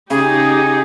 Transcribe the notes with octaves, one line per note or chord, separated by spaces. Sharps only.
C#3 D#4 G4 G#4